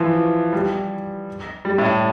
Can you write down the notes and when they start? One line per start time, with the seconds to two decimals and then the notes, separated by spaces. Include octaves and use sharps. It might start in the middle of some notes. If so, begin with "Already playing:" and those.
Already playing: E3 F3
0.53 G3
1.65 G3
1.78 A2